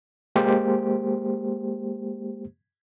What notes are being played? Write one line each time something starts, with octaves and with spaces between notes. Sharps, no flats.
G#3 A#3 G4 C5